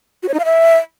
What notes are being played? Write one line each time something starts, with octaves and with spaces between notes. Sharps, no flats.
F#4
C#5
D#4
F5
E5